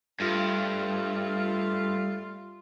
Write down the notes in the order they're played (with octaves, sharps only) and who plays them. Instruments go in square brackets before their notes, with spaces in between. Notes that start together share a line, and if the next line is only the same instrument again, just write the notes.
[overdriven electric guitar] G2 [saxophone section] G3 A3 F4